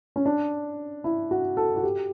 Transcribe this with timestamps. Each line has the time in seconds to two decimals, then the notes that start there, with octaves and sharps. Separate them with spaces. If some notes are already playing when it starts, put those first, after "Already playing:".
0.16 C#4
0.26 D4
1.04 E4
1.31 F#4
1.57 A4
1.76 F#4
1.83 G4